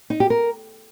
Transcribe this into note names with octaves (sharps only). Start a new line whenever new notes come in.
D#4
G4
A#4